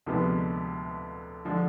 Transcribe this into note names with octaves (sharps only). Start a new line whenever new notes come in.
D2 C3 F3 G#3 B3
D3 F3 G#3